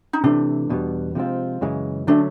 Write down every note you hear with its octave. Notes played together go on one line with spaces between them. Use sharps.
D#4
C3 E3 A3 D4
E2 B2 G3 B3
C3 F3 G#3 C4 F4
F#2 C#3 E3 G#3
D3 F#3 A3 C#4 D4